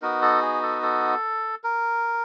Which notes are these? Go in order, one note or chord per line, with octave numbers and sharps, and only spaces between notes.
B3 D#4 F#4 A#4
A4
G#4
A4
A4
A#4